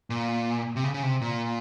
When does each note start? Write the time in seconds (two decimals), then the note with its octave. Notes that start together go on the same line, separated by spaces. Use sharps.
0.10 A#2
0.76 C3
0.84 C#3
0.94 C#3
1.03 C3
1.21 A#2